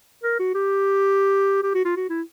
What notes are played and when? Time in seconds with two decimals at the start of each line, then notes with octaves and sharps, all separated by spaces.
0.23 A#4
0.39 F#4
0.55 G4
1.63 G4
1.75 F#4
1.85 F4
1.96 F#4
2.10 E4